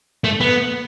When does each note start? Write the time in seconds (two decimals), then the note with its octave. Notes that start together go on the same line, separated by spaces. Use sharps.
0.24 A3
0.40 B3